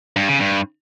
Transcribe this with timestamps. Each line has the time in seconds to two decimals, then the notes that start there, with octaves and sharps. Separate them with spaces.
0.16 G2
0.28 C#3
0.40 G2